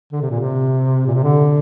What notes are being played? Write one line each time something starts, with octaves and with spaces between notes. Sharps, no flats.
D3
C3
A#2
C3
A#2
C3
D3